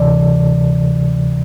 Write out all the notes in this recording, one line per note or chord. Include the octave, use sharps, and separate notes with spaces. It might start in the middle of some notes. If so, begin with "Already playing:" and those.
Already playing: D2 C3 E3 D5